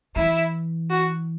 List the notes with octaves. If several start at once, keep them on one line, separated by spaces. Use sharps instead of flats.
E3 E4
F#4